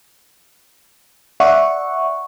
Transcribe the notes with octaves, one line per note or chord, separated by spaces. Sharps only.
D5 E5 F#5 C#6